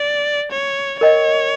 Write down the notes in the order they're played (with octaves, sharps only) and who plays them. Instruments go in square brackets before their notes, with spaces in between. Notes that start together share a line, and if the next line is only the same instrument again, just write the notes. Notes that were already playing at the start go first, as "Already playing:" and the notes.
Already playing: [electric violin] D5
C#5
[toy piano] A#4 D#5 G5 [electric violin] C#5